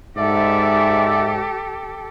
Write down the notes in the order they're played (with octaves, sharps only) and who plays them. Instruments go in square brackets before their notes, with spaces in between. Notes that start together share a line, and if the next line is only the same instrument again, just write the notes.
[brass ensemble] G#2 [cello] G4 A4 [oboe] D5 [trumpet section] E5